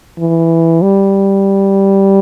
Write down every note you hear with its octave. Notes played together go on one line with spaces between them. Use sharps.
E3
G3